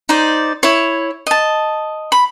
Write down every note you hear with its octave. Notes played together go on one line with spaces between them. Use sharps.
D#4 C5 D5
E4 C#5
D#5 A5
B5